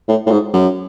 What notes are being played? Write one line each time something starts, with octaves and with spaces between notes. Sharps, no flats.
A2
A2
G#2
F#2